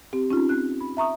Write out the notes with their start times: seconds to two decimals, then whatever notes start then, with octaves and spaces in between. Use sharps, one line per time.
0.13 C4 G4
0.30 C#4 D#4 F4
0.49 C4 F#6
0.81 B5
0.97 E5 A#5 C#6 D#6